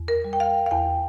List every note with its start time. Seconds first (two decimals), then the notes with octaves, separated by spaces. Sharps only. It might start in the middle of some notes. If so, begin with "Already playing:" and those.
Already playing: E2
0.08 A#4
0.24 G3
0.33 G5
0.40 F5
0.66 F5
0.71 E2 G5